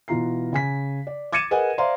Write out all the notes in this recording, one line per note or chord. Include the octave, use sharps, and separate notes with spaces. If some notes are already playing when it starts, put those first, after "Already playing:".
B2 E3 F4 A#5 C7
C#3 G#5 B6
D5
D6 G#6 A6 C#7 D#7 E7
G#4 A#4 B4 D#5 F#5 G#5
C5 D5 E5 F5 A#5 C6